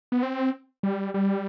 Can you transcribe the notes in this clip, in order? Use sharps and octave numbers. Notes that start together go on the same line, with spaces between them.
B3
C4
G3
G3